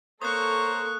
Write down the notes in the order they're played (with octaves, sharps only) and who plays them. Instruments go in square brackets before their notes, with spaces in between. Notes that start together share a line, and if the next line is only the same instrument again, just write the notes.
[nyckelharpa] A#3 C#6 [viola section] A4 [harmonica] C5 C#5 A#5 [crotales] D#6 F#6